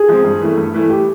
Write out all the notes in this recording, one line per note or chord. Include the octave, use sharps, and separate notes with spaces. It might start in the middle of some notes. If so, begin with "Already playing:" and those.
Already playing: G#4
F3 G#3 C4
G2
E3 A3
G2
E3 A3
G4